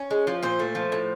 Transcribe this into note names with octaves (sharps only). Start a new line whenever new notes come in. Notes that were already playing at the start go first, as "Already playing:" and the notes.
Already playing: C#4 C#5
G#3
F3
A#2 C5
A3
F3
A2